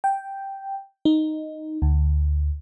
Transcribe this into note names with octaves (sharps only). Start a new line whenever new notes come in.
G5
D#4
D2